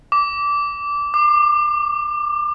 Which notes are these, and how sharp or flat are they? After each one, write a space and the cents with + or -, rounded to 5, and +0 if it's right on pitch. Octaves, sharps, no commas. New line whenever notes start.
D6 -20
D6 +30